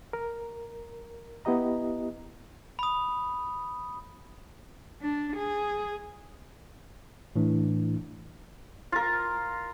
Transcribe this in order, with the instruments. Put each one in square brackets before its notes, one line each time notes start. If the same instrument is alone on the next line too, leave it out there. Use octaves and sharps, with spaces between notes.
[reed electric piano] A#4
B3 E4 G4 D#5 A#5
[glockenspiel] B5 D#6
[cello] D4
G#4
[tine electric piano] A2 E3 D4
[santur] F4 A#4